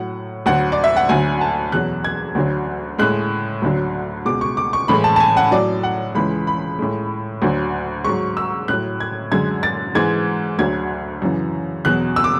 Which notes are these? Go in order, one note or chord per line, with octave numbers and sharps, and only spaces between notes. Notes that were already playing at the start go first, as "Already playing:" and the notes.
Already playing: A2 F#3 F#5
D2 D3 F#3 F#5
D5
E5
F#5
D2 D3 F#3 G#5
A5
E2 B2 F#3 F#6
G#6
D2 D3 F#3
A2 G#3 F#6
D2 D3 F#3
C#2 B2 G#3 D6
C#6
D6
C#6
A2 E3 G#3 B5
A5
A5
G#5
F#5
A2 F#3 D5
F#5
C#2 C#3 E3 G#3 B5
B5
A2 G#3
D2 D3 F#3
G#2 F#3 C#6
E6
A2 F#3 F#6
G#6
F#2 D3 G#3 G#6
A6
G#2 E3 G#3 G#6
D2 D3 F#3 G#6
F#2 C#3 E3
E2 B2 F#3 F#6
E6
D6